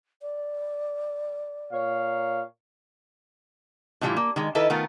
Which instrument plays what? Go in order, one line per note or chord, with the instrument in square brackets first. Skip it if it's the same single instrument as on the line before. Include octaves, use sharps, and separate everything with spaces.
[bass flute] D5
[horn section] A#2 C#5 F5
[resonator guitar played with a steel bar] A2 D#3 E3 G3 E4 F4
A#3
D#3 G#3
D#3 E4 A4 B4 D#5
D#3 A3 B3 F4 A#4